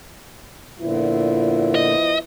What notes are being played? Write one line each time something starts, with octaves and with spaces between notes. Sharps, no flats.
A#2 D3 F3 B3 E4
D#5